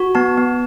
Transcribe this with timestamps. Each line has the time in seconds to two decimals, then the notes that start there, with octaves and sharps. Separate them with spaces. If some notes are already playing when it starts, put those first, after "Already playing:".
Already playing: F#4
0.15 B3 A5
0.38 B3